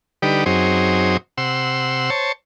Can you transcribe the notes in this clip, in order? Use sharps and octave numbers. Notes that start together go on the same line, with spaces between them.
D3 G3 D#4 G4 B4
F#2 F#3 C4 D#4 G#4 C5
C3 F#5 C6 E6
C5 C#5 A5